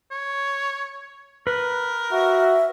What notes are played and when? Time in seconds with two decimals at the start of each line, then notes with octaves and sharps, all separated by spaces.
0.11 C#5
1.47 A#4 B4
2.12 F#4 E5